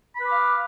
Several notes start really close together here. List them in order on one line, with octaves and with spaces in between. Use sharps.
B5 B4 D6 F5